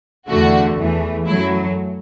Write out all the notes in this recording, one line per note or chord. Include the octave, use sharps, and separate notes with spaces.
E2 D3 A3 F#4
E2 E3 A3
F#2 F#3 A3 E4